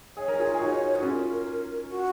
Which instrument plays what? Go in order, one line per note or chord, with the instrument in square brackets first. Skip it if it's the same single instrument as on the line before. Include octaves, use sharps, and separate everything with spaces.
[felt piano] G#4 [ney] C#5
[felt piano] A#4
F4 G#4
G#4
D#4 F#4
[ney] G#4
[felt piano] F#4
[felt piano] C#4 F4 [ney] A#4
[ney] F#4